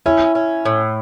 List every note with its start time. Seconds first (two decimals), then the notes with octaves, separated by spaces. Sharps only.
0.06 C#4 E4
0.35 C#4
0.65 A2